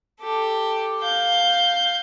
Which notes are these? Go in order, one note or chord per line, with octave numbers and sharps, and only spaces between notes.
G4 A4
F5 G6